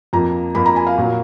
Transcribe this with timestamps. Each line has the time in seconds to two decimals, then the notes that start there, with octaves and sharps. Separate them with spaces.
0.13 F2 F3 A#3 A#5
0.55 F2 F3 A#3 B5
0.66 A#5
0.76 G#5
0.87 F5
0.97 A#2 F#3 A#3